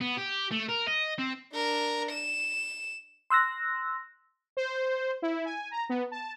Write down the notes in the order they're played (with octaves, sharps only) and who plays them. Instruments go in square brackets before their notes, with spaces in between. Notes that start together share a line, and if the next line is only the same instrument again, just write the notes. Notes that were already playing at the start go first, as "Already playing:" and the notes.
[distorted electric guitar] B3
G4
A3
A#4
D#5
C4
[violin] D4 A#4
E7
[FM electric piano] C6 E6 F#6 A#6
[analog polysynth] C5
E4
G#5
A#5
B3
A5